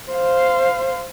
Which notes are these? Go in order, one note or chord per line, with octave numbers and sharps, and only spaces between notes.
C5 F5